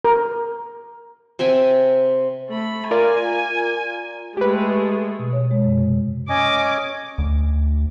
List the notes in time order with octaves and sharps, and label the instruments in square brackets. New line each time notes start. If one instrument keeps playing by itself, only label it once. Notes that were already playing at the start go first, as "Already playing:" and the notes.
[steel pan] A#4
[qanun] C3 E5 G5 G#5
[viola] A3 B5
[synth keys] F4 A#4 D5 [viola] G#5
[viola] G#3 A3 [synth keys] G4 B4
[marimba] B2
C#5
G#3
F#2
C3
[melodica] C#4 D#5 G#5 [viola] D6
[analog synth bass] D2